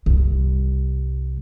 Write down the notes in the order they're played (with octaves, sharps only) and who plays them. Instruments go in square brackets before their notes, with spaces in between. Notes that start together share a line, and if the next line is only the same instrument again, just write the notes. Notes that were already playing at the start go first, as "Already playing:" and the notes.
[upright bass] C2 G2